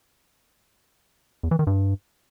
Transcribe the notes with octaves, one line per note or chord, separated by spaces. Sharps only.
E2
E3
D#3
G2